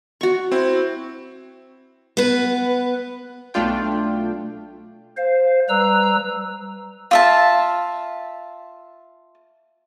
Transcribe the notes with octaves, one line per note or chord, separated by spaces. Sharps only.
F#4 C#6
C4 E4
B3 B4
B1 A3 D4 F4 G5
C5 F5
G3 B4 A#5 E6
F4 E5 A5